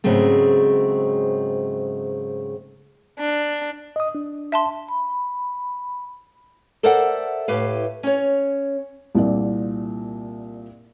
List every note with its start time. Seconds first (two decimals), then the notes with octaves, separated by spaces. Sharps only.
0.04 G#2 C#3 F#3 G#3 A3 C4
3.19 D4
3.96 D#5 D#6
4.15 D4
4.52 E5 A5 C6
4.88 B5
6.83 A4 A#4 C5 D5 E5 F#5
7.48 A2 G4 B4 F5
8.03 C#4 C#5
9.15 C2 A#2 D5